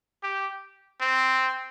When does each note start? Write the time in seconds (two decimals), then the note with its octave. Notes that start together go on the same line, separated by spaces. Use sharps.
0.23 G4
1.01 C4